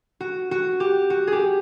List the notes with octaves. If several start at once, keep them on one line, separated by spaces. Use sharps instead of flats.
F#4
F#4
G4
F#4
G#4
G4